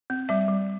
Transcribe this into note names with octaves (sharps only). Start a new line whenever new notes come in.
C4
G3 E5
G3